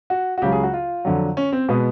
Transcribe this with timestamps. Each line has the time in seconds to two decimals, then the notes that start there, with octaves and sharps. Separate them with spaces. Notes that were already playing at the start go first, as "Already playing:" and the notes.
0.10 F#4
0.38 F#4
0.42 C#2 C#3 F#3 G4
0.52 G#4
0.63 F#4
0.73 F4
1.05 F2 D3 F#3
1.37 C#4
1.52 C4
1.69 B2 G#3 B3